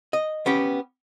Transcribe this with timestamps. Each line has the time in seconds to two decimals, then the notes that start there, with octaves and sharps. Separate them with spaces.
0.13 D#5
0.46 B3 C#4 G4